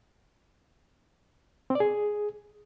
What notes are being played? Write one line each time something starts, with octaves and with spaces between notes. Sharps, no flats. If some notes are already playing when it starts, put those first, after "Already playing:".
C4
D5
G#4